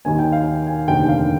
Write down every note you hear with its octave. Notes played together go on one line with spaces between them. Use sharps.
D#2 D#3 A#3 G#5
G5
F5
G#5
F1 D#2 D3 G5
F5